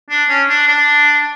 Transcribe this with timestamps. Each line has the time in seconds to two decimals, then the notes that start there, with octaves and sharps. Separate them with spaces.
0.10 D4
0.29 C#4
0.49 D4
0.68 D4